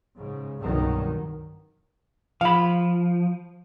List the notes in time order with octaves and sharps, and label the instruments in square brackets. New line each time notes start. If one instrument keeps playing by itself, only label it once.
[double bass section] G#2 C#3
C2 G2 B2 D#3 F#3
[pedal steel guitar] F3 [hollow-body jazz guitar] F5 B5